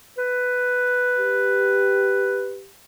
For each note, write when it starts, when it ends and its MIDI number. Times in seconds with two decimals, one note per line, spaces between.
0.18 2.60 71
1.18 2.70 67